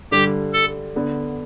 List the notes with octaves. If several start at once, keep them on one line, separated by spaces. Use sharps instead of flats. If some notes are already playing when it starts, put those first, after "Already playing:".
G2 D3 G3 G4
A4
D3 B3